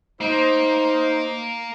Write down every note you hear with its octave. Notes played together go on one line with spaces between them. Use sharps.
A#3 D#4 C5